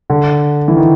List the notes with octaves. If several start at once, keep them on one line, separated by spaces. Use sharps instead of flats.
D3
E3
D#3